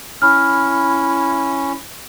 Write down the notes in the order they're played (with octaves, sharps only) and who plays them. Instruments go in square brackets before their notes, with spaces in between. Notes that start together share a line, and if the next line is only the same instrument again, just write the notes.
[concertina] C#4 [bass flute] E4 [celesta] B5 F6